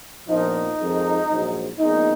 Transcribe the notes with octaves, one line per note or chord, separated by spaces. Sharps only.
A#1 A#2 F3 B3 D#4
F2 D#3 G#3
A#1 G#2 F#3
A#1 A#2 G#3 B3 D#4